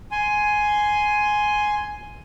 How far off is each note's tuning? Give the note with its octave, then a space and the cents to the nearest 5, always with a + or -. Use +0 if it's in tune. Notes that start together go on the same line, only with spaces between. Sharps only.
G#5 +10 C6 +0